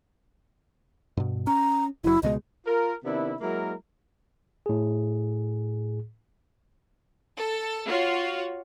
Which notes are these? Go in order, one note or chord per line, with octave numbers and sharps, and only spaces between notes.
G2 B2
C#4 A#5
F#1 F#3 E4
C#2 B2 G#3 D#5
F4 A#4
C3 D#3 B3 D4 E4
F#3 G#3 A#3 E4 A#4
A2 G#4
A4
F4 F#4 C#5